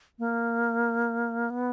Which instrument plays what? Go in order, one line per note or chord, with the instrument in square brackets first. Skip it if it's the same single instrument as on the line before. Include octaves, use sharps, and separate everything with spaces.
[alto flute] A#3
B3